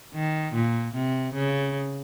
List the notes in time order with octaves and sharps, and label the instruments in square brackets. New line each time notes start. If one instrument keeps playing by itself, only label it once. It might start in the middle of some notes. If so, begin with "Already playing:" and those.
[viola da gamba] D#3
A#2
C3
C#3